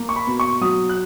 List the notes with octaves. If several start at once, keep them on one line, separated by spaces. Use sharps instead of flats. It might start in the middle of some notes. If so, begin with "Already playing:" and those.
Already playing: A#3
C#6
B5
B2
C#6
F#3 D#6
F#6